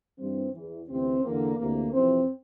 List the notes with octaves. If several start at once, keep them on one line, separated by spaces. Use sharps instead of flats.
G2 E3 C4
E2 E3
D2 C3 E3 C4
E2 D3 A#3
D2 C3 E3 A#3
F2 C3 E3 C4